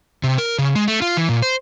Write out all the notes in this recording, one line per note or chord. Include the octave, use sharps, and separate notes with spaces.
C3
A#4
C#3
G#3
A3
F4
E3
A#2
C5